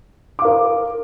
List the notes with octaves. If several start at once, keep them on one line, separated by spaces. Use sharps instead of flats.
A#4 F5 D6